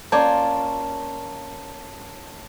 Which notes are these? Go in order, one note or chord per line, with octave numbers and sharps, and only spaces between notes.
A#3 C#4 F4 C#5 D5 A5 D6